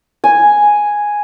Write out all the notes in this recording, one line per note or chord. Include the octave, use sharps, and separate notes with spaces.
G#5